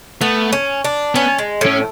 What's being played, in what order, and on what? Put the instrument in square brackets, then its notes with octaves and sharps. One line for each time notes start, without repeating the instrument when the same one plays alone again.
[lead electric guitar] A3 [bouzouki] B3
[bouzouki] C#4
D4
[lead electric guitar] B3 [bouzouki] C#4
[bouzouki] G#3
[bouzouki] A2 [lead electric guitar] C#4